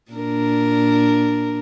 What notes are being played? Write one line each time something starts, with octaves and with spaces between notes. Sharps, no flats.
A#2 D4 A#4